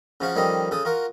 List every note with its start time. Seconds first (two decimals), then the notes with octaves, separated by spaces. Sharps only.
0.21 C#3 F3 C#4 F#4 F5 F#5
0.36 D#3 F3 G3 C#4 A4 D#5
0.71 C#3 A4 D#6
0.85 F4 F#4 A#4 F#5